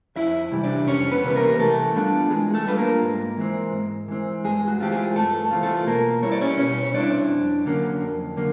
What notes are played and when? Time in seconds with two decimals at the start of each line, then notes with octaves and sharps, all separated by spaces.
0.16 F2 E4 E5
0.52 C3 E3 G3
0.63 D4 D5
0.87 F2 C#4 C#5
1.11 B3 B4
1.24 C3 E3 G3 B4
1.35 A#3 A#4
1.59 E3 A3 A4
1.95 G3 B3 D4 F4
2.30 E3 G#3 G#4
2.54 A3 A4
2.65 G3 B3 D4 F4 B4
2.77 A#3 A#4
3.02 G#2
3.37 E3 G#3 C4
3.73 G#2
4.08 E3 G#3 C4
4.44 G2 G#3 G#4
4.68 F#4
4.80 E3 A3 C4 F4 G4
4.92 G#3 G#4
5.16 G2 A3 A4
5.51 E3 A3 C4 F4
5.63 A3 A4
5.87 B2 A#3 A#4
6.22 G3 C4 E4 C#5
6.32 D5
6.41 C#4 C#5
6.58 B2 C#4 C#5
6.83 C#5
6.94 G3 C4 D4 E4 D5
7.29 F2
7.66 D3 F#3 A#3 C#4
8.01 F2
8.37 D3 F#3 A#3